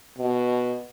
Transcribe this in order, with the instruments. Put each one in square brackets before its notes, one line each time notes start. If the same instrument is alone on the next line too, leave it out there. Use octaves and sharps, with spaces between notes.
[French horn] B2